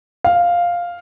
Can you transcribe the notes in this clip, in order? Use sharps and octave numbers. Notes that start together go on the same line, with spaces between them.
F5